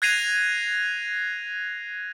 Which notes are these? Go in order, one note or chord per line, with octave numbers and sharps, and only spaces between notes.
F#6 G#6 A#6 C7 D#7 F7